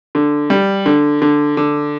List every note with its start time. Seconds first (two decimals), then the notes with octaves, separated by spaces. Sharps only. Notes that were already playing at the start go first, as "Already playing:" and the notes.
0.15 D3
0.50 G3
0.86 D3
1.22 D3
1.57 D3